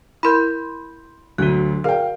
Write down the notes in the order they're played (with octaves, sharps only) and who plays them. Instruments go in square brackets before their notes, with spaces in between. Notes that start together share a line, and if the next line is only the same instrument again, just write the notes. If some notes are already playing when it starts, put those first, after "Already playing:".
[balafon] E4 A#4 [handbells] B5 C6 G6
[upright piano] D2 F#3 [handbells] F#4 F#6
[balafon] G#4 A#4 D5 [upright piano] F5 G5